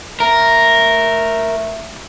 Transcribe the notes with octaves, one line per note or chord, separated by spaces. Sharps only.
A3 A#4